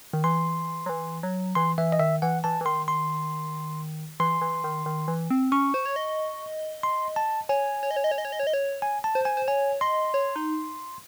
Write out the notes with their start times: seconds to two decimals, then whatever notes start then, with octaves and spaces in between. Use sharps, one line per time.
0.13 D#3
0.24 E3 C6
0.86 F#3
0.89 E3
1.23 F#3
1.55 E3 C6
1.78 E3 E5
1.92 D#5
1.99 D#3 E5
2.22 E3 F#5
2.44 E3 A5
2.61 E3
2.65 D#3 C6
2.88 C6
4.20 E3 C6
4.42 E3
4.64 D#3
4.86 D#3
5.08 E3
5.30 C4
5.52 C#4 C#6
5.74 C5
5.86 C#5
5.96 D#5
6.83 C6
7.16 A5
7.49 C#5 G#5
7.83 C#5
7.91 D#5
7.96 C#5
8.04 D#5
8.11 C#5
8.18 D#5
8.25 C#5
8.32 D#5
8.40 C#5
8.47 D#5
8.53 C#5
8.82 G#5
9.04 A5
9.15 C5
9.25 G#5
9.37 C5
9.48 C#5 G#5
9.81 D#5 C6
10.14 C#5
10.36 D#4